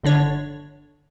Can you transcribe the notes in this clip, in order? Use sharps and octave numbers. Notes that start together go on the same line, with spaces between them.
G1 D3 D4 C#5